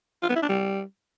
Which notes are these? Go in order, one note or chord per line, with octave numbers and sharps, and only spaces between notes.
F4
B3
E4
D4
G3